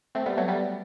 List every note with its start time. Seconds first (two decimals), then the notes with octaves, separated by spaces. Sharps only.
0.15 A3 C4
0.26 G3 B3
0.37 F#3 A3
0.48 G3 B3